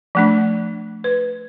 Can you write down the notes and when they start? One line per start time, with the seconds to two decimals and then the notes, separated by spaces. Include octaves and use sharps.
0.15 F3 A3 D4
1.04 B4